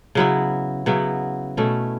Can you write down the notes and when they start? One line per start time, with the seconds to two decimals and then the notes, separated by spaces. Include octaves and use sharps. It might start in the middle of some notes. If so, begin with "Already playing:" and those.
0.15 C#3 F#3 B3 E4
0.86 C#3 F#3 B3 E4
1.57 B2 A3 C#4 E4